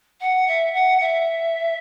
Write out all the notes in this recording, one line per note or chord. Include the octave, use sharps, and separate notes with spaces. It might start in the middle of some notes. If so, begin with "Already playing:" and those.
F#5
E5
F#5
E5